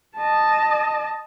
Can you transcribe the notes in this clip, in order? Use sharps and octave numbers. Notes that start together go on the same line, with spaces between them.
D#5 A5